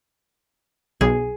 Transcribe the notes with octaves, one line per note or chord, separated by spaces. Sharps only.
B1 G#4